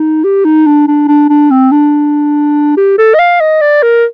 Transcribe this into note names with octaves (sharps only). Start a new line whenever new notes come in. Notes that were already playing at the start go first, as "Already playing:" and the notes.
Already playing: D#4
G4
D#4
D4
D4
D4
D4
C4
D4
G4
A4
D#5
F5
D#5
D5
A#4